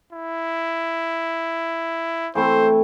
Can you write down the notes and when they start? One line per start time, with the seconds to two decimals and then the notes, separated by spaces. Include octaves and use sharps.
0.13 E4
2.35 E3 A3 C4 C5